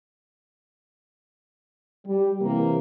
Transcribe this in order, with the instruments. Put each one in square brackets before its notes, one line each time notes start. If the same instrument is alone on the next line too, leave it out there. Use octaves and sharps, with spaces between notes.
[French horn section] G3
C3 E3 A#3